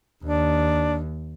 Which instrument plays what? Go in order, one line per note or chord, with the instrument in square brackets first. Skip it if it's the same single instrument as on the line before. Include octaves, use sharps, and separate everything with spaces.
[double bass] D#2 [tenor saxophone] D4